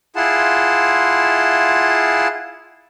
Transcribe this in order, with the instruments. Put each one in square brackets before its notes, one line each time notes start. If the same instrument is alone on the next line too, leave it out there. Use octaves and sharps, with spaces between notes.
[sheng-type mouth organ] E4 F4 G#4 F#5 A5 C6